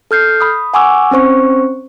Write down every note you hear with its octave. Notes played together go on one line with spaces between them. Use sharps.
A4 F6 G6 C7
B5 D#6
F#5 G#5 C#6 D6 E6
C4 C#4 C5 C#6